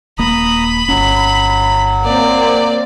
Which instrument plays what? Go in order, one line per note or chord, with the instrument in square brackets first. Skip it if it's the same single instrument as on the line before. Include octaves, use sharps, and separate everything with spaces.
[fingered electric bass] D#1 A#3 [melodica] A#5 D#6 [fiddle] B5
[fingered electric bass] G1 C#4 [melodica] F#3
[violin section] A#3 C4 [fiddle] D5